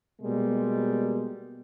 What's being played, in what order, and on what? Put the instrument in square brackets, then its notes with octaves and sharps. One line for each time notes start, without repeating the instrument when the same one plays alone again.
[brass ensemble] B2 G3 G#3 A#3